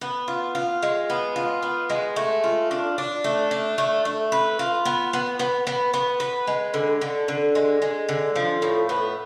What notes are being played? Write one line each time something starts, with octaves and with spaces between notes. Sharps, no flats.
B3
F4
F4
G#3
B3
F4
B3
G#3
A3
F4
D4
D4
A3
D4
A3
A3
B4
F4
B3
B3
B3
B3
B3
B4
G#3
D3
D3
D3
G#3
G#3
D3
F3
A2
B3